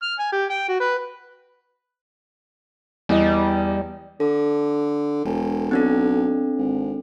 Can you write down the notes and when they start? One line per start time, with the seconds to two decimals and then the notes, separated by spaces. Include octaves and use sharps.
0.03 F6
0.19 G#5
0.32 G4
0.50 G5
0.68 F#4
0.80 B4
3.09 E2 G3 D#5
4.20 D3 A4
5.25 E1
5.71 B1 C4 D4 A4
6.58 G#1